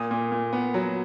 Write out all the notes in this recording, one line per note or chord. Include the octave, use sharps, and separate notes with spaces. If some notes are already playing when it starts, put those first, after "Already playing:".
Already playing: A#2 D#6
A#2
A#2
B3
F#3